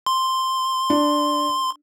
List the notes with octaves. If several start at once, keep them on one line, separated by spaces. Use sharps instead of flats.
C6
D4